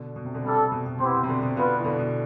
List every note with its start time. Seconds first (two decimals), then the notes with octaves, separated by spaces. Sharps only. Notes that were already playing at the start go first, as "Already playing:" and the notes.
Already playing: B2 D3
0.16 B2
0.25 C3
0.34 B2 D3
0.44 C3 G3 D4 A4
0.72 B2
0.86 B2
1.00 C3 B3 E4 G4 C5
1.14 B2
1.23 C3
1.28 B2 D3
1.42 B2
1.57 B2 D3 B3 F4 B4
1.79 E3
1.84 B2 D3
1.99 B2